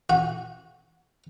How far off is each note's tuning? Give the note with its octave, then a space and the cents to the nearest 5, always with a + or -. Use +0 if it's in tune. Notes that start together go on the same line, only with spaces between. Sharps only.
F#4 -20